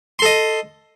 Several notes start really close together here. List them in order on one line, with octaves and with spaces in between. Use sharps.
C6 A4 D#5